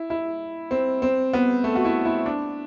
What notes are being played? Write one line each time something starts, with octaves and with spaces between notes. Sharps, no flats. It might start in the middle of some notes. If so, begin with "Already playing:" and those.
Already playing: E4
E4
C4
C4
B3
A3
F#4
E4
E4
D4